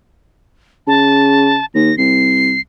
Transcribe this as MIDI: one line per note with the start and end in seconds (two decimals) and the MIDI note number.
0.87 1.58 49
0.87 1.65 81
1.75 1.91 39
1.75 1.95 94
1.98 2.56 36
1.98 2.60 96